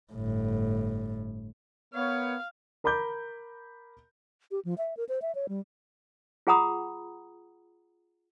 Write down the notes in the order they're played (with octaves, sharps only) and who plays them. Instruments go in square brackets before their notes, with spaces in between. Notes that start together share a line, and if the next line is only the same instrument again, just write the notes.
[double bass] G1 A2
[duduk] B3 [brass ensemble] A#4 B4 C#5 [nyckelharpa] F5
[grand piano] A#4 A#5 B5 D6 G6
[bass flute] G4
F3
E5
A#4
C5
E5
C#5
G3
[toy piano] F4 G#4 F#5 A#5 B5 D#6